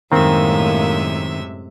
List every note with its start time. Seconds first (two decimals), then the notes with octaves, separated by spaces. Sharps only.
0.12 F#2 A2 C3 D#3 G#3 A#3 C4 E5